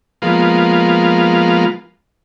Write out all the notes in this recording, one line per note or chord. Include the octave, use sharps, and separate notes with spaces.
F3 G#3 A#3 B3 F4